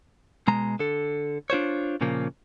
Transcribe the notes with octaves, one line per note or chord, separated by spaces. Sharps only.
B2 G#3 A#5
D3 A4
D4 F4 C5 C#5
A#2 C#3 F3 A#3